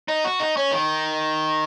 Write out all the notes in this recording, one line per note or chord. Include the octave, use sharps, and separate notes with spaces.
D#4
F#4
D#4
C#4
D#3